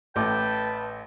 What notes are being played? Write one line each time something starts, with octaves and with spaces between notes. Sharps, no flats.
A1 A3 B4 G5 A5 D6